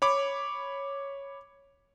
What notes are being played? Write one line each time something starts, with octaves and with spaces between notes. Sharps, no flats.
C#5 B5 D6